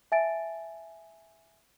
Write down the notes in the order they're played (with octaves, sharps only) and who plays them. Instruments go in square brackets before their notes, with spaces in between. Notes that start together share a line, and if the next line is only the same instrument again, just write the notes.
[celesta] E5 G#5 A5 A6 D7